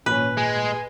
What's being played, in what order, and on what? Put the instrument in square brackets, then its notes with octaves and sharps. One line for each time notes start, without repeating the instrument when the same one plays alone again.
[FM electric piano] G#1 A#2 [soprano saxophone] C#4 [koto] B4
[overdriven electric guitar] G#3 [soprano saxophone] G#5